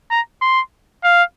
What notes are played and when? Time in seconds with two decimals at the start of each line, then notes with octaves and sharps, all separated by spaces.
0.11 A#5
0.42 C6
1.04 F5